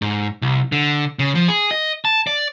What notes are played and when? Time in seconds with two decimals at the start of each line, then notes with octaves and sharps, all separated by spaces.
0.02 G#2
0.42 C2
0.72 D3
1.19 C#3
1.35 F3
1.48 G#4
1.71 D#5
2.05 A5
2.27 D5